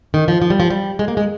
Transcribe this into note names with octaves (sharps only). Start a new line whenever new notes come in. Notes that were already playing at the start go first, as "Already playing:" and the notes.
D#3
F3
F3
G3
F3
G3
G#3
A#3
G#3